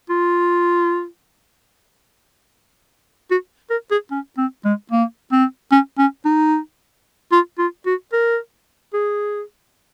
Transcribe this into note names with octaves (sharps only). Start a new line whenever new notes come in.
F4
F#4
A#4
G#4
C#4
C4
G#3
A#3
C4
C#4
C#4
D#4
F4
F4
F#4
A#4
G#4